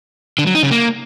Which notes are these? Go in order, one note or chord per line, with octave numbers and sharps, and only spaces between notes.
D3
F#3
D#4
C#3
A#3